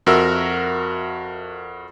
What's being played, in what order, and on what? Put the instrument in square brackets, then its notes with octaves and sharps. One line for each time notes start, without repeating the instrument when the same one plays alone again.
[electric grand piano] F2 F#4 A#4 E5 E6